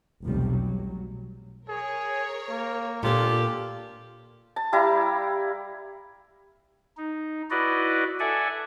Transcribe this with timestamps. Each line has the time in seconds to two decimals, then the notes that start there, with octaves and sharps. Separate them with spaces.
0.23 F1 B1 E2 F3 G3
0.52 F#3
1.69 G#4 A#4 C#5
2.50 A#3
3.03 A#2 A#3 D4 F4 G4 A4
4.56 A5
4.73 G3 E4 F5 A#5
6.97 D#4
7.51 E4 F#4 B4 D5 D#5
8.20 A4 D5 E5 F#5 G#5